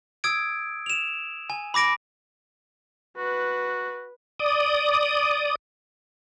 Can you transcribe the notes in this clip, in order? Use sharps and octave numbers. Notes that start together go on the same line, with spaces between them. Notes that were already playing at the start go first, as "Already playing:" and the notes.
D#6 E6 G#6 D7
E7 F7
G#5
B5 D6 A#6 D7
F#4 B4
D5 D#6